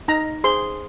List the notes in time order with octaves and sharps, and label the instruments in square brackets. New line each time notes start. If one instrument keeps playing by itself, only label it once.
[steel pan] D#4 A#5
G#4 C5 C6